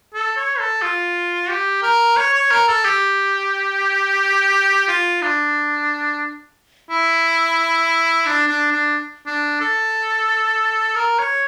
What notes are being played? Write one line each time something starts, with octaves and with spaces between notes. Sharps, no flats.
A4
C#5
A4
F4
G4
A#4
C#5
C#5
A#4
A4
G4
F4
D4
E4
D4
D4
D4
D4
A4
A#4
C#5